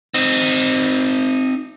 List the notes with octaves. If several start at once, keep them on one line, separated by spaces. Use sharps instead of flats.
C4 D#4